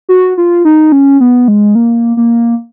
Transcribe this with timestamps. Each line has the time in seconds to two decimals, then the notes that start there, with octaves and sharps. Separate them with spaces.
0.09 F#4
0.38 F4
0.65 D#4
0.92 C#4
1.20 B3
1.48 G#3
1.75 A#3
2.17 A#3